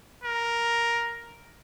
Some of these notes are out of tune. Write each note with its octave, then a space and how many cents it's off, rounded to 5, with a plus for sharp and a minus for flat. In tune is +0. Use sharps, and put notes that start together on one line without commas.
A#4 +5